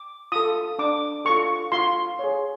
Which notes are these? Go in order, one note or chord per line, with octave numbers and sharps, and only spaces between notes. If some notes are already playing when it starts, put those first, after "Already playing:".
Already playing: D6
F4 A4 D#6
D4 D6
F4 A4 C#6
F4 C6
G#4 C#5